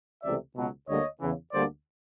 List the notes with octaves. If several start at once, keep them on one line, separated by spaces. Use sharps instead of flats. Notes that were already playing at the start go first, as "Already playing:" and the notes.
C#2 C3 E3 A3 D5 E5
C#2 B2 F#3
D2 D3 G3 A#3 C#5 D#5
E2 C#3 E3
D2 D3 G3 A#3 C5 D5